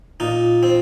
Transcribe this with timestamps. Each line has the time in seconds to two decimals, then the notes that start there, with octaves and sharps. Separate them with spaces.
0.20 A#2 D#4
0.63 C4